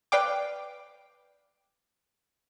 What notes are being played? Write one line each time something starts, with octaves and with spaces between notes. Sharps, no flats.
B4 D5 F5 G5 D6